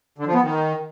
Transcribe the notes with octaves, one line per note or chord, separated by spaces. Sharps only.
D3
F3
B3
D#3